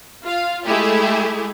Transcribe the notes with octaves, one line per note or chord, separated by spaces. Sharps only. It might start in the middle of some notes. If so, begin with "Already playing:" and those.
F4 F5
G#3 A3 E4 G4 G#4